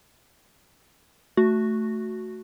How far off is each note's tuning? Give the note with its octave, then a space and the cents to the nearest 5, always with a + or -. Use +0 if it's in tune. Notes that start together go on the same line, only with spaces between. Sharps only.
A3 +0 F#4 +0